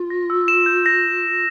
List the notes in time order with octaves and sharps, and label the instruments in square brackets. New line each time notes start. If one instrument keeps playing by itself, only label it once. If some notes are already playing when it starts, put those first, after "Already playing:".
Already playing: [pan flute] F4
[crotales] A#6
E6
E7
G6
A#6